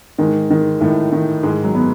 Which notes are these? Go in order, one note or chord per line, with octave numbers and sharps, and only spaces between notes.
G#2 D#3 G#3
D#3
A2 D#3 A3
D#3
G#2 D#3 G#3
F#2 F#3
B3